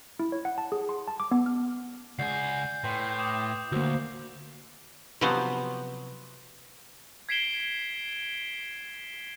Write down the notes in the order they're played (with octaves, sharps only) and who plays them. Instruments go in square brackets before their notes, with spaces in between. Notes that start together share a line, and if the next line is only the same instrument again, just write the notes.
[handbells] E4
C#5
F#5
A5
G#4
C6
A5
D6
B3
F6
[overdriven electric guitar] C#2 G#4 [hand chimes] D5 F#5 [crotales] G6 C7
[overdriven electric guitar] A2 [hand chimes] B4 G5 C6
[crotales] D6 D#6 E7
[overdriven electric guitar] D2 [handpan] A#3 F#4 [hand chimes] C5 E6 G6
[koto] C3 F3 F#3 B3 F#4 C5
[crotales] G#6 B6 C7 D7 E7 G7